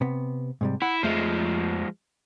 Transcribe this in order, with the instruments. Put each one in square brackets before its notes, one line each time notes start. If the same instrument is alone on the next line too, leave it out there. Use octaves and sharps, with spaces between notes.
[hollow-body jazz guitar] C3 B3
G#2 C3 G3
[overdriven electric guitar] E4 [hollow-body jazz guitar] F#5
[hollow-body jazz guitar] F2 A3 E5 [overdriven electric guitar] F3 G#3